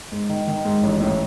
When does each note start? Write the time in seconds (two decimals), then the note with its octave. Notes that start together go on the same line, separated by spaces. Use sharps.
0.12 G#2
0.29 D#3
0.48 D#3
0.65 G#2
0.83 A1
1.01 A2